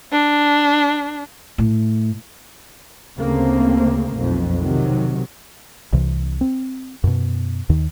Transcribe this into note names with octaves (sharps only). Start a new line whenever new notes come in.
D4
A2
D2 C#3 A3 A#3 C4
B1 F2
C3 D#3 F#3
C2 C3 E3
C4
F#2 B2
D#2 D#3